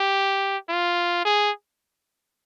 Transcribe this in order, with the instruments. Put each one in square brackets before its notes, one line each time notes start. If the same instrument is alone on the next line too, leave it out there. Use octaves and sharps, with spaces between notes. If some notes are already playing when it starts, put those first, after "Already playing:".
Already playing: [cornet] G4
F4
G#4